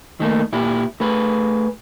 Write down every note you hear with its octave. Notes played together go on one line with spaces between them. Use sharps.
D#3 A3 A#3
A#2 E4 G4
A3 G#4 B4